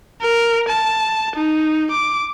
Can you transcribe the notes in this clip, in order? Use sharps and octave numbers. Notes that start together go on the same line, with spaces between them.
A#4
A5
D#4
D6